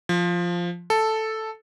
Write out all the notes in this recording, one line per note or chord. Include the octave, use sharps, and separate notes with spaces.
F3
A4